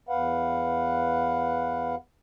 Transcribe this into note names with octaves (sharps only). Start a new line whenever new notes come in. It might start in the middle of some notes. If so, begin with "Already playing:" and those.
E2 B4 F5 F#5